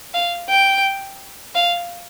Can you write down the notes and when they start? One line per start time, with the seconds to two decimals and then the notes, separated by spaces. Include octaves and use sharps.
0.14 F5
0.49 G5
1.55 F5